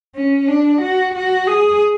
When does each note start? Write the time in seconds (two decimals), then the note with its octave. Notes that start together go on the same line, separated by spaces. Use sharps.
0.16 C#4
0.48 D4
0.82 F#4
1.15 F#4
1.47 G#4